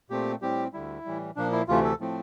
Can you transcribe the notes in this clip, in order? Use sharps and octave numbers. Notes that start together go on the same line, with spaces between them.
A#2 A3 C4 G4
A2 G3 C4 G4
D2 D3 G3 E4
A2 E3 G3
A#2 F3 A#3 D4
E4
D2 C3 E3 A3 F4
A4
A2 F3 A3 C4